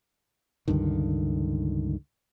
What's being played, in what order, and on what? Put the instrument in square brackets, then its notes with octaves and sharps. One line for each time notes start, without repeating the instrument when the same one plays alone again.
[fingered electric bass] C#2 G2 D3 D#3